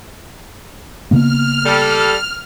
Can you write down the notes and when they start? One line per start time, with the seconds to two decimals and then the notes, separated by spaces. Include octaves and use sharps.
1.11 C#3 A#3 B3 F6
1.65 G3 A4